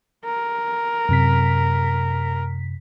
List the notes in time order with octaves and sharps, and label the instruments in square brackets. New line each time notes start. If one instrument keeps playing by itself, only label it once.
[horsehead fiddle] A#4
[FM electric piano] F#2 C3 B6